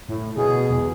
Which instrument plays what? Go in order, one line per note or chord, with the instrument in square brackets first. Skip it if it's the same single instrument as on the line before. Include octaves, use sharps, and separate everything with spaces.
[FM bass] A2
[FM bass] B2 [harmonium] G#4
[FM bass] E2